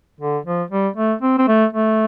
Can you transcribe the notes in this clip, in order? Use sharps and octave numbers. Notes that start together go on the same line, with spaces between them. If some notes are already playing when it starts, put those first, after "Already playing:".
D3
F3
G3
A3
C4
C4
A3
A3